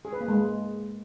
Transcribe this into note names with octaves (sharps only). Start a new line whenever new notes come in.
G#4
B4
A#3
G#3